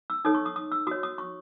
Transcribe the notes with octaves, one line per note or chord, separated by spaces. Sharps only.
E6
D#4 A4 C#5 D#6
C#6
D#6
D#6
E6
F#4 C#5 D#6
D#6
C#6